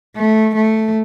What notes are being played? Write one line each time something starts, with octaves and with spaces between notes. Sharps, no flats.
A3
A3